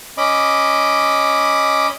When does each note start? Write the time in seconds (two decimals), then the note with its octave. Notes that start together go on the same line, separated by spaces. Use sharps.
0.18 C#4 D#5 B5 D6